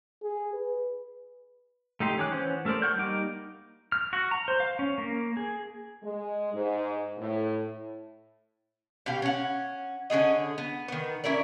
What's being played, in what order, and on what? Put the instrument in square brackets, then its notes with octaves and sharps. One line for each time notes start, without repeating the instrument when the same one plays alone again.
[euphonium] G#4
B4
[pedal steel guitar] A3 D#4 G4 C6
D#3 C#4 G#4 D6 F#6
E3 C#4 C5 F#5
A3 A4 A#4 C5 D5
F#5 C#6 F6 G6
G3 A#3 D#4 D6
F6
F#4
A#5
C5
F5
C#4
A#3
G#4
[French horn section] G#3
G#2
A2
[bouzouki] B2 G4 F5
C#4 F#5
D3 C#4 G#4 D#5
B3
D#3 B3
C#4 E4 A#4 D5